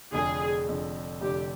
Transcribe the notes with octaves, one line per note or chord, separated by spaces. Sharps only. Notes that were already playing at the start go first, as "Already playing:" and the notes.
F1 F2 D3 G#4
F1 F2 D3
F1 F2 D3 G4